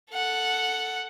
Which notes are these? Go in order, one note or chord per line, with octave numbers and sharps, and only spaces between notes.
A4 F#5